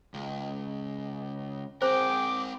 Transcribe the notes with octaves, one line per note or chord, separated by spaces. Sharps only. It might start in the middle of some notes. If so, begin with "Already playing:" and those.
C#2
C4 G#4 A#4 C5 G5 D6